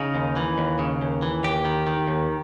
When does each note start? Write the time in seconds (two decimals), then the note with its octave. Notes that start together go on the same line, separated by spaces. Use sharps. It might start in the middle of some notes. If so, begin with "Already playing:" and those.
Already playing: C#3 D#4
0.15 D#2
0.36 E3
0.58 D#2
0.79 C#3
1.02 D#2
1.22 E3
1.44 D#2 G4
1.65 D#3
1.87 D#3
2.07 D#2